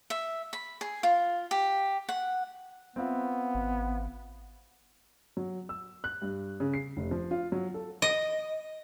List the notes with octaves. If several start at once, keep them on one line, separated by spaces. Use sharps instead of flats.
E5
B5
G#4
F4
G4
F#5
B3 C4 F4 E5
G#1
F#3
E6
F#6
G2
C#3
C7
F1
F3
F4
F#3
A4
D#5